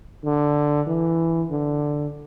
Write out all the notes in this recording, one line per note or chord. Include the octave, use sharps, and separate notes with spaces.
D3
E3
D3